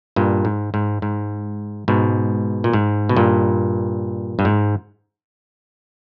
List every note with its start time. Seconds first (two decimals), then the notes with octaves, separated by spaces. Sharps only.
0.16 G2 A#2
0.45 G#2
0.74 G#2
1.02 G#2
1.88 G#2 B2
2.64 A#2
2.73 G#2
3.09 B2
3.16 G2 A#2
4.39 G2
4.45 G#2